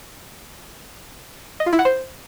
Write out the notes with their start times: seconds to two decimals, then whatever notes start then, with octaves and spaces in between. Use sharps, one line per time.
1.60 D#5
1.66 F4
1.73 E4
1.79 F#5
1.85 C5